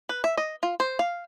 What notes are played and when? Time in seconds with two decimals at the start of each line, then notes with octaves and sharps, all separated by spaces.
0.09 B4
0.24 E5
0.37 D#5
0.63 F4
0.80 C5
0.99 F5